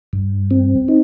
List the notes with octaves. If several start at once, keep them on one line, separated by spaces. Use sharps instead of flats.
G2
C4
D#4